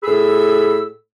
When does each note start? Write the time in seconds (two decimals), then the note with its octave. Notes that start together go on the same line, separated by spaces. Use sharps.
0.04 A2 G#4 B5 E6